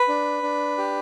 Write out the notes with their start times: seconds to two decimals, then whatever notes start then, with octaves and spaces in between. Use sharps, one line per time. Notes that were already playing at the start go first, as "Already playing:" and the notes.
Already playing: B4
0.08 D4
0.43 D4
0.78 G4